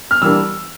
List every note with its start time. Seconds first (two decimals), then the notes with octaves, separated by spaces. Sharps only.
0.11 F6
0.22 E3 G3 A#3 D4 E6